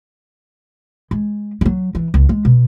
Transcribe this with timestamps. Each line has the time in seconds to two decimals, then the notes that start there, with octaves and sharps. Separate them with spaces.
1.11 G#3
1.61 F#3 G#3
1.95 E3
2.14 C#2
2.29 G#3
2.45 B2